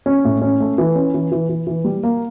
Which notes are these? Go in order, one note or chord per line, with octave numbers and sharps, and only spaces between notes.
C#4
A2
C#4
A3
E3
C#4
E3
E3
E3
E3
G3
A#3